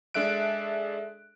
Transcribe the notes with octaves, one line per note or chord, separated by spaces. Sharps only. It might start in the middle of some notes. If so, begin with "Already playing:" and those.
G#3 D4 A4 E5 F#6 D7